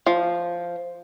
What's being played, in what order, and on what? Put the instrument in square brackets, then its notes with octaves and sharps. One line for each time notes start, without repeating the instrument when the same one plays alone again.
[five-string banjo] F3